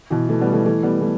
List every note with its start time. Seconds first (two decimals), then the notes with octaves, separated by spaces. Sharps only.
0.10 B2 E3
0.29 E3 A3
0.41 G3 B3
0.53 E3 A3
0.65 E3 A3
0.83 G3 B3
1.01 E3 A3